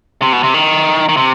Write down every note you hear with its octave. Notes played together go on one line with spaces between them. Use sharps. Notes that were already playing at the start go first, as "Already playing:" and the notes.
C3
B2
C3
D#3
D#3
C3